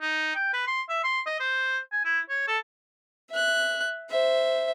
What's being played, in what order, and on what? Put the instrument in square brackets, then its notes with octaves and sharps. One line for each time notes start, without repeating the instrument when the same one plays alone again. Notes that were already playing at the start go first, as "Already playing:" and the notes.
[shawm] D#4
G5
B4
C6
E5
C6
D#5
C5
G#5
E4
C#5
A4
[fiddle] E5 F#6
C5 E5